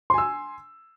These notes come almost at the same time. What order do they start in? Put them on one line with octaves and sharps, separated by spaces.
C6 G#5 E6